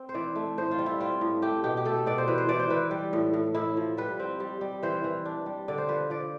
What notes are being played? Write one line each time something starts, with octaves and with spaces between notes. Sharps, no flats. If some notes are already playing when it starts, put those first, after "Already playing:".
Already playing: C4
C5
E3 D5
A3
A2 C5
F4
G3
E4
C4 F4
A2
A3 G4
B2 G4
G4
A3 A4
B2 D5
C5
E3 B4
C5
E3 D5
C5
E3 B4
G3
A2
A2
A2 E4
F3
G3 B4
C4
G3
G3
E3 C5
E3
D4
G3
D3 D5
C5
F3 B4
F3 D5